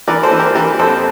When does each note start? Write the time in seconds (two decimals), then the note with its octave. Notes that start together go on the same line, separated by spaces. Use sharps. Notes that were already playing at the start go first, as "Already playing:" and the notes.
0.08 E3 A#4 D5
0.23 A4 C5
0.32 E3
0.40 G4 A#4
0.55 E3 G4 A#4
0.79 F2 A4 C5